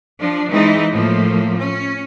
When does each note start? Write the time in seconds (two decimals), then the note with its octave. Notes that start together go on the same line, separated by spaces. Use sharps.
0.19 F3 D4
0.51 E3 G#3 C4 D#4
0.92 A2 F3 A3 A#3
1.57 C#4